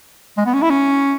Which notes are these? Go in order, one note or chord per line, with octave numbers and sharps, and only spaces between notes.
G#3
B3
C#4
E4
C#4